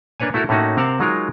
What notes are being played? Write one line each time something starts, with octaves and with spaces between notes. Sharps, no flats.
A#3 D4 B4 C#5 G#5
A3 E4 F#4 A4 A#4
A2 A3 A#3 C#4 D#4 F#4
C3 C4 A#4 F5 F#5 A5
F#3 G#3 D#4 F4 A#4